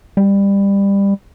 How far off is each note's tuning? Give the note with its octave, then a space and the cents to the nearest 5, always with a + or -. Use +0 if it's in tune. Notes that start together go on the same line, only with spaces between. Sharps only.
G3 +20